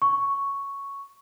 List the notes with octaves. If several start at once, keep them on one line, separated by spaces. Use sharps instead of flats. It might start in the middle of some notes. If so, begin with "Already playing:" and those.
C#6